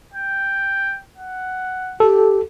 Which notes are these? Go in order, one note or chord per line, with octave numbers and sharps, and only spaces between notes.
G5
F#5
G4 A4